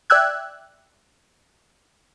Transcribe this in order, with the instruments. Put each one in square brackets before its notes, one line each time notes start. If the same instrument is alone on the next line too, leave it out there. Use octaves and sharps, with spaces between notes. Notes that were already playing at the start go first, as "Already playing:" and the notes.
[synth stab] D5 E5 G5 E6 F#6 G#6